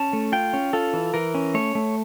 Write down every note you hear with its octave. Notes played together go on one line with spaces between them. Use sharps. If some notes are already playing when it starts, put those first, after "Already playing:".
Already playing: C#4 A5
A3
F4 G5
C#4
F4 A4
E3
E3 A#4
C#4
A3 C#5
A3